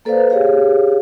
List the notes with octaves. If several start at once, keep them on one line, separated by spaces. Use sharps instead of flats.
A#3 A4 B4 C5 D5 F5
G4 G#4 C#5 F5